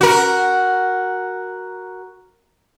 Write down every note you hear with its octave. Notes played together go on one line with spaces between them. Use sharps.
F#4 A#4